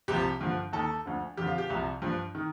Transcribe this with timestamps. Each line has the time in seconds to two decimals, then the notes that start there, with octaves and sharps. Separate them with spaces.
0.08 C2 C3 F3 G4
0.41 G2 D3 F3
0.73 D#2 D#3 A4
1.06 D2 D3 F3
1.37 F2 D3 F3 G4
1.47 F4
1.58 G4
1.70 C2 C3 F3
2.02 G2 F3
2.35 D#3